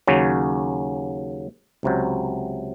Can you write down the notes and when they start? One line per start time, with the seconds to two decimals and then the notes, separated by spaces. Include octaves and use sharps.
0.07 D#2 C#3 F#3 C#4
1.83 C#2 C3 F#3